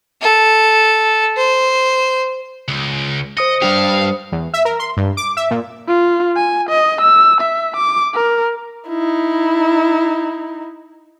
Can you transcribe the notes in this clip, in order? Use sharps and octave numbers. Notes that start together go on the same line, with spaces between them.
A4
C5
C#2
C5 D#5 D#6 C#7
G3 D4 G4 F5
E2
E5
A#4
C6
G2
D6
E5
A#2
F4
G#5
D#5
E6
E5
D6
A#4
D#4 E4